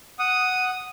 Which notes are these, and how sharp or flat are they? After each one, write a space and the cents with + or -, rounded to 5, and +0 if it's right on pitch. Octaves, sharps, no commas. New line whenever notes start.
F#5 +0 D#6 +0